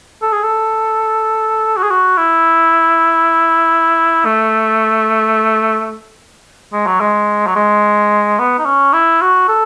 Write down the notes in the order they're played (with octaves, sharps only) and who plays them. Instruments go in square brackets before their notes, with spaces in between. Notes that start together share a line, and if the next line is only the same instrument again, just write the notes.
[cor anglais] A4
G#4
A4
F#4
G#4
F#4
E4
A3
G#3
F#3
G#3
F#3
G#3
B3
D#4
C#4
E4
F#4
A4